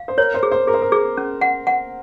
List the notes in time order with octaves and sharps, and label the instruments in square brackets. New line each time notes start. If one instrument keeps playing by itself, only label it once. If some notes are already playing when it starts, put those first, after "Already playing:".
Already playing: [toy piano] F5
[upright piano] C5
[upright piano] A#4 [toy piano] C#5
[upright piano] C5
[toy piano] G#4
[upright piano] C5
[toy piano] G#4 [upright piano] A#4
[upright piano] C5
A#4
[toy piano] G#4
C#4
F#5
F#5